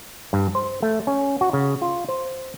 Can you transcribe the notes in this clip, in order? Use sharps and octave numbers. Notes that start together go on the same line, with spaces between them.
G2
C5
A3
C#4
F#4
C#3
F4
C5